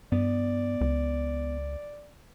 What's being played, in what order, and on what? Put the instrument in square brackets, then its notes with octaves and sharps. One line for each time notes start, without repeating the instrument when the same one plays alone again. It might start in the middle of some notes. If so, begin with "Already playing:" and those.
[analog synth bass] G2 [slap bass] B3 [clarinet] D5
[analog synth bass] C#2